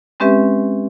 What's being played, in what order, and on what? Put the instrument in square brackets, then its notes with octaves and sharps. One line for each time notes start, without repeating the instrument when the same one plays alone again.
[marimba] G#3 C4 C#4 G4 B4 E5